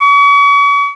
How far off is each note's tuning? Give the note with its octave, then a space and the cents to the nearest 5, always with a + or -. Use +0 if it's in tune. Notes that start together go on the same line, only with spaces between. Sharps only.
C#6 +40